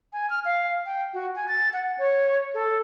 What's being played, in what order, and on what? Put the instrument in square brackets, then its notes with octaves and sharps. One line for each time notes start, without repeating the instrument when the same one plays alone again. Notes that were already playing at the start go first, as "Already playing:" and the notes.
[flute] G#5
F6
F5
G5
F#4
G#5
A6
F#5
C#5
A4